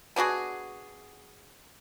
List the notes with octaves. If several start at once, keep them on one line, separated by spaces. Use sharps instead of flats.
B3 D4 F#4 G#4